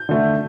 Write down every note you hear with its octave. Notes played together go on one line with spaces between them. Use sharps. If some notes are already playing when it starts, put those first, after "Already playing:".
Already playing: G6
D3 A3